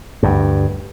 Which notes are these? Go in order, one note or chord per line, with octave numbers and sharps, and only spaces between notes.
D2 G2